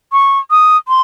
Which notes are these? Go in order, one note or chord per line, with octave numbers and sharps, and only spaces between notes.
C#6
D#6
C6